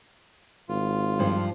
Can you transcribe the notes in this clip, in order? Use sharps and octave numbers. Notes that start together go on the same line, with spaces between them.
G#1 F4
G2 F3